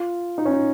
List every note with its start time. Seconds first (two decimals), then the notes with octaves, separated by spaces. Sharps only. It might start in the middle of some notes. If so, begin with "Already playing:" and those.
Already playing: F4
0.38 D#4
0.45 C#4
0.52 D#4